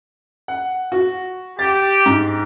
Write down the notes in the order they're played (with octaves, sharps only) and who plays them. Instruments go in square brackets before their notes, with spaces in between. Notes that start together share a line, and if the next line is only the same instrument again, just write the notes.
[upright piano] F#5
F#4
[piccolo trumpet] G4 [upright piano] A6
[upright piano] G#2